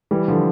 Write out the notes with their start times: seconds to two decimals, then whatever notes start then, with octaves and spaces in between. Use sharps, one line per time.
0.11 E3 G3
0.28 D3 F3